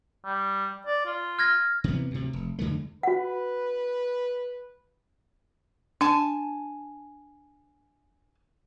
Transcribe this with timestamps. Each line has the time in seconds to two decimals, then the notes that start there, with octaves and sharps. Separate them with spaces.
0.25 G3
0.87 D5
1.06 F4
1.39 F6 G#6 A#6
1.84 C3 E3 B3
2.11 D2 C3
2.33 F1
2.59 F2 D3 G#3 A3
3.03 F#4 B4 F#5
6.01 D4 G#5 A5